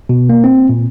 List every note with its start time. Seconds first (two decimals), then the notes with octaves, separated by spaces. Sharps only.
0.09 B2
0.29 A#3
0.44 C4
0.69 A#2